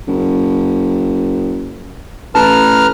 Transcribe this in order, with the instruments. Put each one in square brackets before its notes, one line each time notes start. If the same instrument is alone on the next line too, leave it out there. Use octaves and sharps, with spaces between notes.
[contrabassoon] F#1
[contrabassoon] A1 [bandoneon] B4 A#5 F6 [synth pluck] A5